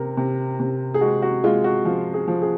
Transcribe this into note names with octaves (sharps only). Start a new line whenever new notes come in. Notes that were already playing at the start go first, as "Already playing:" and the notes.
Already playing: C3 A#4
C3
C3
G#4
G#3 F#4
F#4
G#3 F4
F#4
F3 F4
G#4
F3
G#4